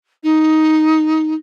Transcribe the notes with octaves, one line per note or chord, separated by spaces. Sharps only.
D#4